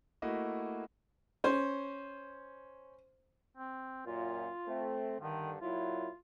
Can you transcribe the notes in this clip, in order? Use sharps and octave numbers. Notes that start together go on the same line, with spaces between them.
A3 A#3 E4 F#4 D#5
C#4 C5
C4
F#2 A#2 F4
A3 C4
G2 D3 D#3
A#2 F#3 E4 F4